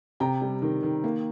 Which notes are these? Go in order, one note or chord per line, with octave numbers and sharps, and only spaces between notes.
C3 G5 A#5
G3
D#3
D#3
A#3